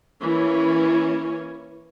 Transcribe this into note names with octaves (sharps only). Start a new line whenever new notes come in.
E3 A#3 C#4 C#5